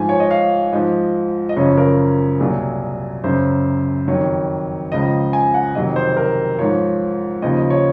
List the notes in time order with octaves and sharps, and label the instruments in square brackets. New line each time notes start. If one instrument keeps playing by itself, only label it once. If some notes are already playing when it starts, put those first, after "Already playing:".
Already playing: [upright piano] G#2 F3 G#5
C#5
D#5
F5
G#2 F3 D#5
D#5
F#2 C#3 F3 C#5
A#4
C2 A#2 F#3 G#4
F#2 C#3 F#3 C5
F2 D#3 F#3 C#5
C#2 C#3 F3 D#5
G#5
F#5
F2 C3 D#3 F#3 D#5
C5
A#4
G#2 F3 C#5
D#2 C#3 F3 D#5
D#5
C#5